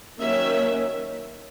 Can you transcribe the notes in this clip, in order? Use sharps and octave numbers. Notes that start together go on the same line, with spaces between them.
D#3 F#3 A#3 C#4 E5